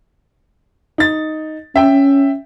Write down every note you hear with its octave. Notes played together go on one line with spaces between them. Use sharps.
D#4 A6
C#4 E5 G5